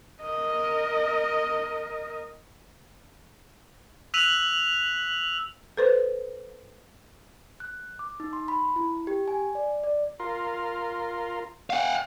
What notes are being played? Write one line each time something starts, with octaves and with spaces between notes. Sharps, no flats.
A#4 D#5
E6 F#6 B6 D#7 F7 F#7
A4 B4 C5
F#6
D6
D#4
C6
B5
E4
G4
G#5
D5
D5
F4 A#4 C6
F5 F#5